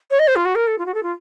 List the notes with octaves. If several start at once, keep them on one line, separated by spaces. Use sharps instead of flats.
C#5
D#5
C5
F4
F#4
A#4
A4
F4
F#4
A4
F4